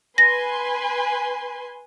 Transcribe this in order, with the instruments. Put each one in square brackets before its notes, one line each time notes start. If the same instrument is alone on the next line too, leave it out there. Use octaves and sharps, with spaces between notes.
[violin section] B4 G#5 C6 [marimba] A#6